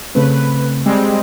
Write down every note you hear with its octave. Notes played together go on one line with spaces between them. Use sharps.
C#3 A3 C4 B4
G3 G#3 C4